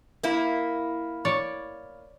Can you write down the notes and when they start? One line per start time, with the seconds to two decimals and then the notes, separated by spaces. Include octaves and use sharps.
0.23 A#3 E4
1.25 C#5 D5